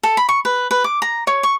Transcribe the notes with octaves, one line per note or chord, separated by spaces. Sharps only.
A4
B5
C#6
B4
B4
D6
A#5
C#5
C#6